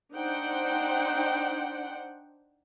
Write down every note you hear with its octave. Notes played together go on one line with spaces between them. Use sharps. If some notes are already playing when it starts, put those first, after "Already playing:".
D4 D#4 C5 F#5 G5